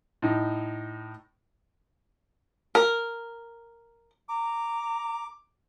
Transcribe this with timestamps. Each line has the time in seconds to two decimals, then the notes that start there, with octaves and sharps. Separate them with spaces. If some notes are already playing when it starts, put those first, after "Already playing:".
0.22 A2 D#4
2.75 A#4
4.29 A#5 D6